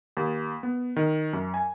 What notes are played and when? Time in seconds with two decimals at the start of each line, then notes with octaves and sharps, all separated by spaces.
0.17 D#2
0.63 B3
0.96 D#3
1.33 F#2
1.54 G#5